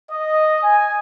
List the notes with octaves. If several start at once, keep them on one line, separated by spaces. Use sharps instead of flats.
D#5
G#5